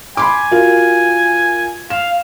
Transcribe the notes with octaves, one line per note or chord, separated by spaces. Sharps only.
G#5 B5 C6 D6
F4 F#4 A#4
F5 E7